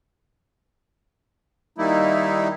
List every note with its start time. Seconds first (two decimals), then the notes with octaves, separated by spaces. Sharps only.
1.78 D#3 G3 A#3 D#4 E4